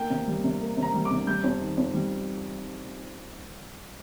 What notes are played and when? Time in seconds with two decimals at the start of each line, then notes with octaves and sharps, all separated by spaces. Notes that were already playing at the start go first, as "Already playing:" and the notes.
Already playing: A#3 G5
0.10 C3
0.27 G3
0.44 C3
0.61 A#3
0.77 C3
0.83 A#5
0.94 G3
1.05 D6
1.11 C3
1.27 G3 G6
1.44 F2
1.61 D#3
1.78 F2
1.94 G3